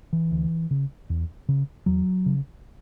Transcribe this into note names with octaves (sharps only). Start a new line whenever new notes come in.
E3
D2
C#3
E2
C#3
E2 F#3
C#3